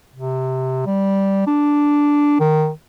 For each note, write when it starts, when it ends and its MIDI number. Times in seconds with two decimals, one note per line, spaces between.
0.15 0.85 48
0.86 1.47 55
1.47 2.37 62
2.40 2.70 51